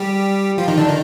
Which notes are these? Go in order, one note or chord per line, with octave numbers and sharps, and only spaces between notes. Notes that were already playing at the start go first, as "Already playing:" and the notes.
Already playing: G3 G4
F3 F4
D#3 D#4
D3 D4
D#3 D#4